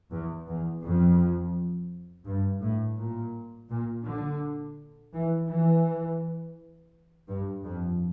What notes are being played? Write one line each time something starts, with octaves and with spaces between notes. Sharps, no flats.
E2
E2
F2
G2
A2
A#2
A#2
D3
E3
E3
G2
F2